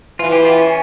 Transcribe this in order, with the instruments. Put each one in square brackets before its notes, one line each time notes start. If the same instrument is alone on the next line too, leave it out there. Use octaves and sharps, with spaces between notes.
[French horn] E3 [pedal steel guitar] F4
[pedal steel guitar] G4
F4
C#4